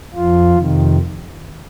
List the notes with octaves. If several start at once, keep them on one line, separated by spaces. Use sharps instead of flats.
F2 F3 F4
F2 C3 D#3